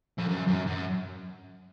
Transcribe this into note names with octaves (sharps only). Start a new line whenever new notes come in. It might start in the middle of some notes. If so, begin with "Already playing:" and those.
F2
F#2
F#2
F#2